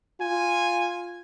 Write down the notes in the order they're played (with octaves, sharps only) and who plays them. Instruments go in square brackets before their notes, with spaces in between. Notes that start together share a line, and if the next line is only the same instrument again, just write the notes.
[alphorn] F4 [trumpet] G#5